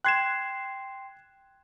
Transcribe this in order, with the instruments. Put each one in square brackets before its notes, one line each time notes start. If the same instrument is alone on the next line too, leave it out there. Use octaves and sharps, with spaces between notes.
[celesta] G5 C6 C7 [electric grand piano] F#6 G#6 E7